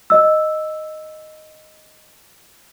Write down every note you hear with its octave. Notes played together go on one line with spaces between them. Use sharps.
D#5 E6